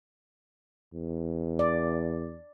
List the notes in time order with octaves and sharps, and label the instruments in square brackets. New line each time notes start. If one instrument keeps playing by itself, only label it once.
[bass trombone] E2
[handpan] D5